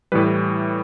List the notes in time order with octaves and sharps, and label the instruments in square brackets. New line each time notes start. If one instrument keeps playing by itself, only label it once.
[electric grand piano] A2 E3 G3 B4